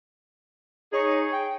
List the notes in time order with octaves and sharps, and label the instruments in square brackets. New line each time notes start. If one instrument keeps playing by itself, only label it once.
[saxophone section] D#4 G#4 [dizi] C#5
[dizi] G5